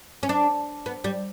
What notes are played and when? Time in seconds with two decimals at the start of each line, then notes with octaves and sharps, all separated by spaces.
0.23 C#4
0.29 D4
0.86 B3
1.04 G3